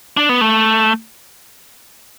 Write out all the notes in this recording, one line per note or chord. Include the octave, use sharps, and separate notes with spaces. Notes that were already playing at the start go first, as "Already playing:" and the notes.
D4
B3
A3